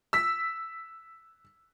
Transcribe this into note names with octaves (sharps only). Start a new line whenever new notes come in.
E6 B6